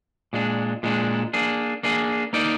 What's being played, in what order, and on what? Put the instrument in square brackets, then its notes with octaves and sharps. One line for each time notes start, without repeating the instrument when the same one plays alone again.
[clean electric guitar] A#2 G#3 D4
A#2 G#3 D4
A#3 D4 G#4
A#3 D4 G#4
A#3 D#4 A#4 D5